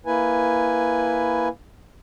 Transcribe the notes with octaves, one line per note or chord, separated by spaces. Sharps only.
A#3 E4 B4 G#5